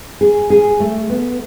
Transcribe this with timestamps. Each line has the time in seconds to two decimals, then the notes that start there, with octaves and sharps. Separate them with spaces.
0.21 G#4
0.50 G#4
0.80 A3
1.10 B3